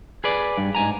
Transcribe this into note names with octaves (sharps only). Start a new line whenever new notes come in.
G#4 B4 D5
G2
G#2 G#5 A#5